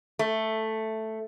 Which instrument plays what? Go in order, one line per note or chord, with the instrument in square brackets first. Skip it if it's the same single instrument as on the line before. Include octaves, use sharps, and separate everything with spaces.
[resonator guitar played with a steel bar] A3